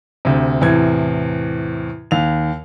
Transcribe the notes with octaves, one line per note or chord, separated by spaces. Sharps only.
D2 C3
E2 A2 C3 G#6
D#2 F7